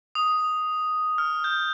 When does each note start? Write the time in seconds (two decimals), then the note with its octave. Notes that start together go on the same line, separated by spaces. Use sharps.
0.15 D#6
1.18 F6
1.44 G6